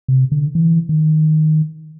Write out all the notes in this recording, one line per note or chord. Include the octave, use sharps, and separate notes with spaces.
C3
D3
E3
D#3